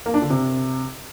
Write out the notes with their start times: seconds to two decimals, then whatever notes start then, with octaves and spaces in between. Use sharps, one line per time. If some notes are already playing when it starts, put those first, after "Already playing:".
0.06 A#3
0.14 D4
0.22 D3
0.30 C3